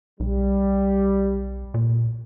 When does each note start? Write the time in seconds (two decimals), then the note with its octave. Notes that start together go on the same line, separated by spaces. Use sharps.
0.20 B1 G3
1.74 A#2